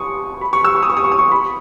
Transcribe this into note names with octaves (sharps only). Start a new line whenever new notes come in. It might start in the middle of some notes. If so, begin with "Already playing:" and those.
Already playing: C#6 D#6
B5
C#6
E6
C#6
D#6
C#6
D#6
C#6
D#6
C#6
B5